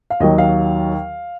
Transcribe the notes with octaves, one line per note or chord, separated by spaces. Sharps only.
F5
D#2 D#3 F#3 D#5
F5